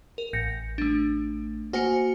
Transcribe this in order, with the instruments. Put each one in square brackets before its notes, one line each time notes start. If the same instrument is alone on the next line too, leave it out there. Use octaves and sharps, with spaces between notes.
[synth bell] A#4
[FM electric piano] A1 [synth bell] G6 A#6 C#7
[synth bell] A3 D4
[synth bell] A#3 C5 G#5 [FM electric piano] F#4 C#7